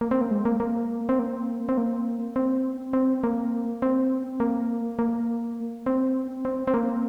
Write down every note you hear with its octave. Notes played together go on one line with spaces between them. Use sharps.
A#3
C4
A#3
G#3
A#3
A#3
C4
A#3
C4
A#3
C4
C4
A#3
C4
A#3
A#3
C4
C4
C4
A#3